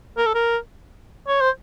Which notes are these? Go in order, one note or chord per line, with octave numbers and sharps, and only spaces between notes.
A#4
A4
A#4
C#5
C5